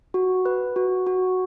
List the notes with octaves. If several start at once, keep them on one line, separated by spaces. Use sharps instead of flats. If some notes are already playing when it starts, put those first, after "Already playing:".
F#4
B4
F#4
F#4